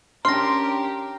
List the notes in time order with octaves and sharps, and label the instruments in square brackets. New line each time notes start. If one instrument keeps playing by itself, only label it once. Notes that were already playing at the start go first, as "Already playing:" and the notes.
[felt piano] C#4 D4 [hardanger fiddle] G4 A#4 [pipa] C6 [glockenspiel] F6 A#6